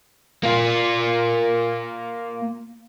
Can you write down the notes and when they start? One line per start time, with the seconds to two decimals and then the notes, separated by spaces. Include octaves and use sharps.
0.43 A#3 F4